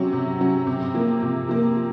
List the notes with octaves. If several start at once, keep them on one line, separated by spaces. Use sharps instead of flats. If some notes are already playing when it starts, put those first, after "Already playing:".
Already playing: C3 F#3 C#4
C3
F#3 C#4
C3
F3 A#3
C3
F3 A#3